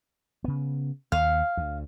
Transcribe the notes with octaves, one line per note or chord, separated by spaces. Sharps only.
C#3 B3
D#2 F5
D2